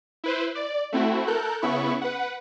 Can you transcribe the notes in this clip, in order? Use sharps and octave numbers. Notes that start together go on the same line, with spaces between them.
E4 B4 C5
D5
A3 C4 E4 F#4
A4 A#4 F#6 G6
C#3 B3 E4 B5 C#6
B4 F#5